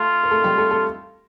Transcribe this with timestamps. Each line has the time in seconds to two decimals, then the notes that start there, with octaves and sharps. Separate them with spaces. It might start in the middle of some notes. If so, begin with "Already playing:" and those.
Already playing: A3 F4 A4
0.23 A#4
0.31 A3 A4
0.44 G3 G4
0.58 A3 A4
0.71 A3 A4